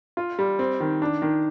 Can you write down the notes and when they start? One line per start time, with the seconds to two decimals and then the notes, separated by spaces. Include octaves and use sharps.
0.17 F4
0.39 G3
0.59 C4
0.80 D#3
1.02 D4
1.22 D#3